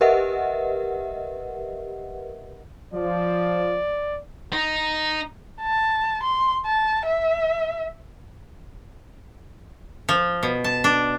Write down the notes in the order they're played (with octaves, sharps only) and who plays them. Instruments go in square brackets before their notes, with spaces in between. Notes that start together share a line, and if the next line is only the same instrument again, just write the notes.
[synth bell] G4 A#4 B4 D#5 E5 F#5
[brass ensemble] F3 [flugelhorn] D5
[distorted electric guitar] D#4
[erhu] A5
C6
A5
E5
[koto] F3
B2
A5
D4